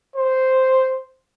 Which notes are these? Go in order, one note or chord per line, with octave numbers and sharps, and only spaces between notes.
C5